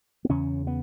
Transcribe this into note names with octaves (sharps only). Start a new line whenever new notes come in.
B3
E2 C#3 C#4
B3